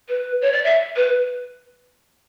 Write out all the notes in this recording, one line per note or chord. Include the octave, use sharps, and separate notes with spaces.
B4
C#5
D5
E5
B4